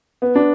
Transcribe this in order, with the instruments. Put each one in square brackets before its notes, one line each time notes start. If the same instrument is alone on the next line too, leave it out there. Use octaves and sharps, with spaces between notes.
[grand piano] B3
D4